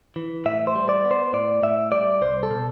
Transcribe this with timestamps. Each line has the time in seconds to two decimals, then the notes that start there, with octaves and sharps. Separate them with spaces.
0.16 E3
0.46 A2 E5
0.67 C5
0.75 G3
0.89 D5
1.05 B3
1.11 C5
1.33 A2 D5
1.63 A2 E5
1.92 G3 D5
2.21 C2 C5
2.43 A4
2.51 B2